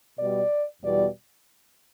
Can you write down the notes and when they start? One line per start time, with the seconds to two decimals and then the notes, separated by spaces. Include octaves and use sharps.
0.17 B2 G3 D5
0.82 E2 B2 G3 D5